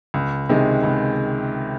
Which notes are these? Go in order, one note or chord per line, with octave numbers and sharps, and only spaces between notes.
C#2
C3 D#3 G#3
C#2